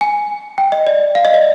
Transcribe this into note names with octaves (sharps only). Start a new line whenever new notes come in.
G#5
G5
D#5
D5
F5
D#5
D5